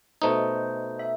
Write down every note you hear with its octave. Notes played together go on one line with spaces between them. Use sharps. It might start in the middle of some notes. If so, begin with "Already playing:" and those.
B2 A3 D#4 C5
E5